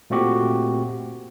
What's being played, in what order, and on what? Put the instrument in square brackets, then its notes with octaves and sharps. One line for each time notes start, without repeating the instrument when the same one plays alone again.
[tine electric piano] A#2 A3 C4 F#4 G4